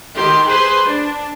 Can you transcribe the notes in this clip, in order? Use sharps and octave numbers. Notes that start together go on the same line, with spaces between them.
D#3 G4 C6
G#4 B4 C5 C6
D4